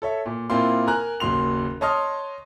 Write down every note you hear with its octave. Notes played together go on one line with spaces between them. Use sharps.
A4 C#5 E5
A#2
A#2 A#3 C4 E4 F4 C6
A#4 G#5 A#5 F#6
F#1 D#2 F#3 C6 F7
C#5 D#5 A5 C6 D#6 F6